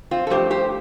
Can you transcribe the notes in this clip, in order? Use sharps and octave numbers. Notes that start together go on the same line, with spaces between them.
C4 F4
A4
G2 F3 A3 G4 C5
G4 C5